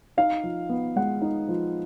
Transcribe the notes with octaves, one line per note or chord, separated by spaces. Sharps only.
D#4 F5
F3
B3
G#3 F#5
D#4
F3